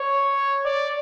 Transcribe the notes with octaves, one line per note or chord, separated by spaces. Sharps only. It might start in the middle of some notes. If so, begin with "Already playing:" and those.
Already playing: C#5
D5